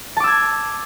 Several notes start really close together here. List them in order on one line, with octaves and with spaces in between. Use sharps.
A5 D6 E6 G#6